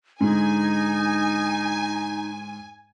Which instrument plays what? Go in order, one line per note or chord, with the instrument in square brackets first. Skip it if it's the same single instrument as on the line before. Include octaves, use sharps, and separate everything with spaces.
[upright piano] G#2 D3 [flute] D#4 [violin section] G#5